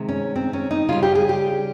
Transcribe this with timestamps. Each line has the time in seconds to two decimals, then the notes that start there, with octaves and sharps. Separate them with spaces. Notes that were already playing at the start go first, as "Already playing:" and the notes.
Already playing: C3 D#3 G#3
0.09 C#4
0.36 C4
0.53 C#4
0.71 D#4
0.89 C#3 G3 F4
1.03 G4
1.15 G#4
1.29 G4